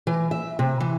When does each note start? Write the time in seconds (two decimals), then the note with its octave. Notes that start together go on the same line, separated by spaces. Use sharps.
0.07 E3
0.31 E5
0.59 C3
0.80 E3